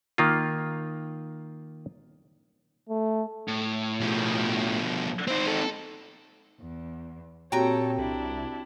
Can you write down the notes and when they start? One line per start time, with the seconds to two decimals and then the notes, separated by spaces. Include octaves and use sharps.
0.18 D#3 A#3 F4
2.89 A3
3.48 A2
4.00 B2 F3
5.28 C4 D#4 C5
5.48 A4
6.62 E2
7.52 A#2 C4 F#4 G4 A4 C#5 G5 A#5
7.98 C2 D4 E4